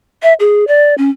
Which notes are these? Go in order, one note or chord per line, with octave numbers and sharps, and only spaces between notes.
E5
G#4
D5
C#4